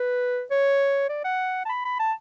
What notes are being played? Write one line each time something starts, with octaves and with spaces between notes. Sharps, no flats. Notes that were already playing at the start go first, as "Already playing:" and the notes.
Already playing: B4
C#5
D5
F#5
A5
B5
B5
A5